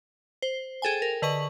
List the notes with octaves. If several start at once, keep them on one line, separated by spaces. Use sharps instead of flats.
C5
G#4 A4 G5 G#5
A#4
D3 B4 D#5 C#6 F#7